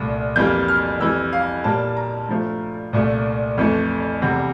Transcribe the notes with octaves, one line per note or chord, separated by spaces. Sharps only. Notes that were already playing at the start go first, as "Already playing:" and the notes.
Already playing: C2 A#2 A3
F2 E3 G3 A#3 G6
F6
F2 E3 G3 E6
F5
A#2 G3 A#3 A5
A#5
G2 F3 A3
C2 A#2 A3
F2 E3 A3
E2 C3 G3